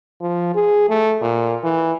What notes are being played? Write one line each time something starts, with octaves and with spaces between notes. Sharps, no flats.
F3
G#4
A3
A#2
E3